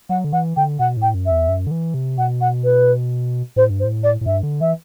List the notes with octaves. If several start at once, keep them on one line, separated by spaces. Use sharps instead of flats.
F#3 F#5
D3
E3 F#5
D3 G5
B2 F#5
A2 G5
F#2
E5
E2
F#2
D3
E3
C3
B2 F#5
F#5
B4
A2 C5
G2
C5
A2
D5
A2
G2 E5
D3
E3 E5